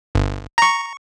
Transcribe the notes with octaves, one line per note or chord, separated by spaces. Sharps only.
G1
A#5 C#6